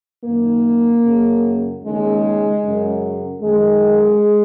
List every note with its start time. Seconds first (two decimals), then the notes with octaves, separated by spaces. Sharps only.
0.25 F#2 D#3 A#3
1.04 F#2 C#3
1.83 D#2 C#3 G#3
2.63 F#2 C#3
3.42 F#2 D#3 G#3